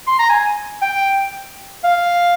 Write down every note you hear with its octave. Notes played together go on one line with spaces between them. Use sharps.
C6
A#5
G#5
G5
F5